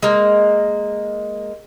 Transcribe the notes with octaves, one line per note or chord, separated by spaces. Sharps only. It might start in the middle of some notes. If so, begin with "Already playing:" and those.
G#3 A#3